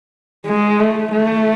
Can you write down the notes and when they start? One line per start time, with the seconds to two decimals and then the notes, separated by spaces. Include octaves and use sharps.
0.46 G#3
0.80 A3
1.12 A3